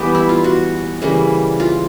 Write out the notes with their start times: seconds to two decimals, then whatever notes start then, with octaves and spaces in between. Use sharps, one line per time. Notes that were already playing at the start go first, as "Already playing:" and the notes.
Already playing: E3 G3 B3 G4
0.15 E4
0.29 F4
0.44 F#4
1.02 C#3 E3 G3 A#3
1.60 F4